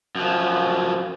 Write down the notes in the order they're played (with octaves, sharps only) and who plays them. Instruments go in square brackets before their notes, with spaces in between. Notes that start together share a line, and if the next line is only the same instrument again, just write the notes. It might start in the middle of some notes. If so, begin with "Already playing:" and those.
[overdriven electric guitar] F#2 F3